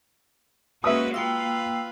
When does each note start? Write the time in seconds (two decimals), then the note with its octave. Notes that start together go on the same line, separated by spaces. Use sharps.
0.84 G#3 A#3 C#4 F#4 B4 E5 D#6
1.14 A#3 F4 B4 F5 G5 E6